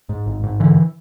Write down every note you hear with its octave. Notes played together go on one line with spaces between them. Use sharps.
G#2
G#1
G#2
D3 E3